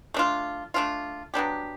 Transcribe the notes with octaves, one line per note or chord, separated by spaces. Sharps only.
A3 D4 F4
A3 D4 F4
F#3 B3 D4 G4